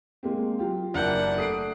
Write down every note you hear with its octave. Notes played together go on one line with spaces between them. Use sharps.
G#3 A#3 C4
F#3 F4 G4
F#1 D4 A#4 F#5 G6
A3 D#6 C7 D7